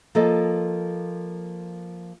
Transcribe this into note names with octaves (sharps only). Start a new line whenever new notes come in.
F3 A#3 A4 D#5